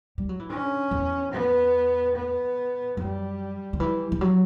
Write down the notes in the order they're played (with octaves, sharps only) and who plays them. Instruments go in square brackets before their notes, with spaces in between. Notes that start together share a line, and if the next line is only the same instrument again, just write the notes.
[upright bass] G3
F#3
E3
[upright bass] D3 [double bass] C#4
[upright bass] E2
[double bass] B3
B3
[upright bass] F#2 [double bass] G3
[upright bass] D3
[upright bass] E3 [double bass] G3
[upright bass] E3
F#3